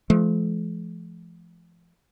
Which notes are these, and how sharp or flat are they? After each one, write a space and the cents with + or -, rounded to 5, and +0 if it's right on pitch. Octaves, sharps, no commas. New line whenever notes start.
F3 -35 A3 -45